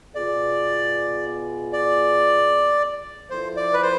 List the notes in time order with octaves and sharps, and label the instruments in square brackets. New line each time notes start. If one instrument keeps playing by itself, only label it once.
[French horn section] B2 B3 F4 G#4 [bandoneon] D5
[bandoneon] D5
[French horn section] F3 B3 E4 A4 [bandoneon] C5
[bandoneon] D5
B4
C5